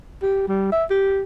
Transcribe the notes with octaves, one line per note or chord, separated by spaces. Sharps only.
G4
G3
E5
G4